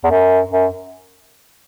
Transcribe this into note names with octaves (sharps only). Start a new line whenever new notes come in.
E2
F#2
F#2